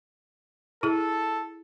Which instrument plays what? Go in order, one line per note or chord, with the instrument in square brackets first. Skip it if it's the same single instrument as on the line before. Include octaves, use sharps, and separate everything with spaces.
[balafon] E4 G#4 [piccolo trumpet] A4